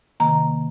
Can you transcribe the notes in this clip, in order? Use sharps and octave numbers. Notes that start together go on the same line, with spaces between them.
C3 D#3 A#3 A#5